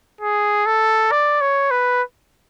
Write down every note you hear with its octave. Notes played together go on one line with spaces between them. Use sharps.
G#4
A4
D5
C#5
B4